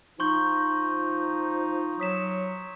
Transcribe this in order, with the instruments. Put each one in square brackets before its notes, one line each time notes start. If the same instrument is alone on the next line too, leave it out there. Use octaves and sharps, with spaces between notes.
[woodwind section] F3 D#4 [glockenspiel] C6 C#6 G6
[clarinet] F#3 [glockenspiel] D#6 B6 E7